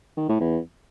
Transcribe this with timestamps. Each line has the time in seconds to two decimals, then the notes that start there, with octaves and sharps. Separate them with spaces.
0.17 D#3
0.29 A2
0.40 E2